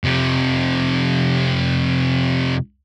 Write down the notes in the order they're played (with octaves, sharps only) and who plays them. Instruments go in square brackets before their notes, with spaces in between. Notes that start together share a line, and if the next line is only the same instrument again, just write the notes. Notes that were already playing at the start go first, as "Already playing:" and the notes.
[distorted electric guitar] F2 C3